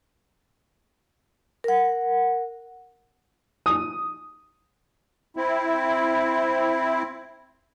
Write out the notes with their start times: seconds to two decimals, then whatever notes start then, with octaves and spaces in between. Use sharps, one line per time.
1.64 A#4 F#5
3.66 D#6
5.37 C4 E4